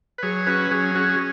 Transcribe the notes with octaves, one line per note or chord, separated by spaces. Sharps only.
B4
F#3 G#4 C#5
C#4 F#4 B4
F#3 G#4
C#4 F#4
G#4